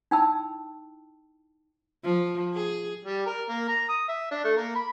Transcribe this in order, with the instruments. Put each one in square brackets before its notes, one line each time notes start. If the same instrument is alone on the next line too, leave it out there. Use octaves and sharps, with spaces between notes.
[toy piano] D#4 E4 G5 A5 B5 E6
[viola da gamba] F3
G#4
[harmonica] G3
A#4
A#3
A#5
D#6
E5
D4
A3
A#3
B5